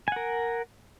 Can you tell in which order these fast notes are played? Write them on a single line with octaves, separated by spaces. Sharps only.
G#5 F#5 A#4